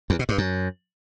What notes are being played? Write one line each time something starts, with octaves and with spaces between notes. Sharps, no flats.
E2
B2
G2
F#2